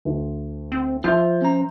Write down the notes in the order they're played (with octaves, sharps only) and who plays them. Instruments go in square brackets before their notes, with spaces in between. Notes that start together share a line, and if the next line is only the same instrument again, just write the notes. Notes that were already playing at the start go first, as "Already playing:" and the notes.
[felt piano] D2
[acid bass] C4
[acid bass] F3 [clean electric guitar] F4 [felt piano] E5 C6 G6
[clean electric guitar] C#4 A#5